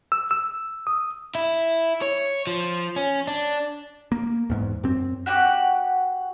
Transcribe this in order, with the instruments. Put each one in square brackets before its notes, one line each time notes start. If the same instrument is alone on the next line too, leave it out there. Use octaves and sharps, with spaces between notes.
[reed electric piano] E6
E6
D#6
[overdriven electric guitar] E4
C#5
F3
C#4
D4
[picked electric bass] A#3
E2 G#2
F#2 C4
[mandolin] F#4 G4 F#5 D6